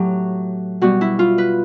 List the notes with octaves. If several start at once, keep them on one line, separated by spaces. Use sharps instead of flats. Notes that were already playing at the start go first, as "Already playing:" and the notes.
Already playing: A2 F#3 G4
B2 G3 F#4
E4
F4
B4